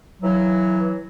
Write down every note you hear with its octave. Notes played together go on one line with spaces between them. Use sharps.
E3 F#3